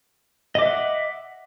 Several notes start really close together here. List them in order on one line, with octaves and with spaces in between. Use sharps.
D#5 D6 E5 F#5